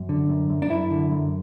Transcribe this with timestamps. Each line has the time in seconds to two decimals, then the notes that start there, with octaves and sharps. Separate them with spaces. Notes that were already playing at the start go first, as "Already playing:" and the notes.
Already playing: F#2
0.09 D3
0.29 F#2
0.50 F#2
0.62 D4
0.70 F#2 E4
0.91 D3
1.11 F#2